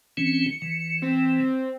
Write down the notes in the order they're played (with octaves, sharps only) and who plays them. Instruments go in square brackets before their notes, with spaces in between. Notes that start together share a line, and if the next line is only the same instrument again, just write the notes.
[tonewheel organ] E3 C4 C#4 [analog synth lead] C#7
[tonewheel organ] E3
[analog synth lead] C4